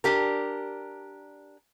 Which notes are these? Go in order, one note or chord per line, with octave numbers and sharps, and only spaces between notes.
D4 G4 A#4